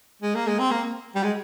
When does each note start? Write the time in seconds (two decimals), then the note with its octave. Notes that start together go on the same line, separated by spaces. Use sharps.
0.22 G#3
0.35 A#3
0.47 G#3
0.59 C4
0.71 A#3
1.15 G3
1.23 G#3